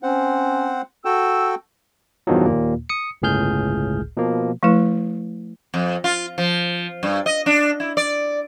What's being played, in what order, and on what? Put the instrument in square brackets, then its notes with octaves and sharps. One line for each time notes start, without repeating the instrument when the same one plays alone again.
[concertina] C4 C5 F#5 [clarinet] C#4
[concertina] F#4 A4 G5 [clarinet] E6
[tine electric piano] E2 G2 B2 D#3 F3 F#3
D#2 A#2 A#3
D#6 C#7
G1 C#2 A2 G#4 F6 G6
B2 F3 A#3
[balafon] F3 A3 E4 B4
[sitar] F2
F4
F3
G2
D#5
D4
E4
D5